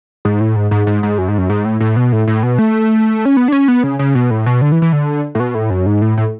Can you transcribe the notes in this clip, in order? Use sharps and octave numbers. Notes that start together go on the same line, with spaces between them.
G#2
A2
G#2
G#2
G#2
G#2
F#2
G#2
F#2
G#2
A2
A2
B2
A2
A2
B2
A3
C#4
B3
D4
C#4
B3
C#3
C#3
B2
A2
B2
D3
E3
E3
D3
A2
B2
A2
F#2
G#2
A2
A2